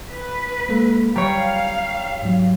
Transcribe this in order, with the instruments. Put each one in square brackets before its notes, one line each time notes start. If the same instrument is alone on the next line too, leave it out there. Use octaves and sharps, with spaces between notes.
[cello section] B4
[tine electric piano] G#3 A#3 A4
[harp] G3 C#5 [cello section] F5 [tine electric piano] G5 A#5
[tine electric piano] G#2 F#3